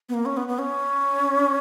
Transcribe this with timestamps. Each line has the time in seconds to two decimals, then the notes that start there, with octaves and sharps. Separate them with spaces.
0.09 B3
0.14 A#3
0.25 C#4
0.37 B3
0.48 B3
0.59 C#4